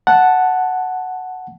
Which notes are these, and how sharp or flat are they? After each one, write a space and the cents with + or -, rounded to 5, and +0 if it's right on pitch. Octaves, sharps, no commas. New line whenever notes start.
F#5 +0 A5 +0